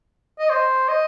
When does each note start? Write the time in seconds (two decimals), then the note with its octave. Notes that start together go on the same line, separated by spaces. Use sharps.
0.39 D#5
0.50 C5
0.88 D#5